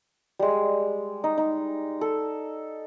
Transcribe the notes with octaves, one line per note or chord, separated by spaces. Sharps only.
G3 G#3
D#4
D#4
A4